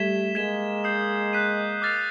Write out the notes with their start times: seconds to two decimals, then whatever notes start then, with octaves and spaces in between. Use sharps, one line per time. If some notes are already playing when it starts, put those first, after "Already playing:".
Already playing: G3 A3 G#6 B6 E7 G7
0.35 G#3 A#3 G#6 B6 E7 G7
0.84 D#6 G6 C7
1.33 F#6 B6 D#7
1.82 D6 F6 A6 C7 F7